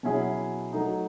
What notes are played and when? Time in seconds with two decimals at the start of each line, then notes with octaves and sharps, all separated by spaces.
0.03 B2 F#3 C#4 E4 G#4
0.72 F#3 A3 D#4